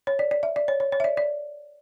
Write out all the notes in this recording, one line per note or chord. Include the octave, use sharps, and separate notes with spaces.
C#5
D5
D5
E5
D5
C#5
C#5
C#5
E5
D5
D5